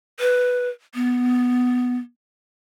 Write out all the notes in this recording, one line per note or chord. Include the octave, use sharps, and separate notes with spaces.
B4
B3